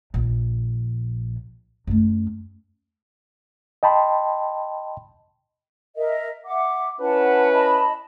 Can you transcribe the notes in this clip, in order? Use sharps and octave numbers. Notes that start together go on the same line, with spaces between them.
A#1
F#2 A3
D#5 G5 A5 B5 C6
A#4 D#5 E5
E5 F#5 D6
C#4 E4 B4 F#5 A5
D#5 A5 B5